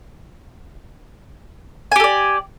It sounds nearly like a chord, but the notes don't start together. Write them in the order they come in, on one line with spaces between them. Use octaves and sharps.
G#5 G4 A4 D5